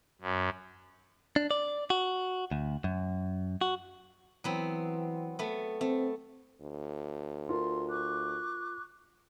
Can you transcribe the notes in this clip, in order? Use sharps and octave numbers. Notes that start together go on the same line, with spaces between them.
F#2
D4
D5
F#4
D2
F#2
F#4
E3 F#3 B3 C4
A3 B3
A3 C4
D2
F4 A#4 C6
C#6 D6 F#6